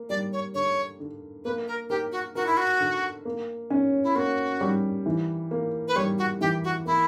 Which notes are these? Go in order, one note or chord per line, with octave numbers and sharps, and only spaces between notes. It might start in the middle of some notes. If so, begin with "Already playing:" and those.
Already playing: A#3
G3 D5
C#5
D3 C#5
D3
A#3 B4
A#4
G4 A#4
F#4
F#4 A#4
E4
F#4
D3
A#3
C#4
E4
A#3 F#4
G3
E3
A#3
B4
G3 C#5
F#4
E3 G4
F#4
A#3 E4